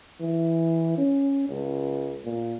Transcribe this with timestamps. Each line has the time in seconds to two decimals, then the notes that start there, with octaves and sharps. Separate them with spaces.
0.21 E3
0.98 C#4
1.49 C#2
2.25 A#2